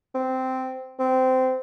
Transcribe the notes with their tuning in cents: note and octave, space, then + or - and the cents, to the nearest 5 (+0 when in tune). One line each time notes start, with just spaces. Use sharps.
C4 -10
C4 -20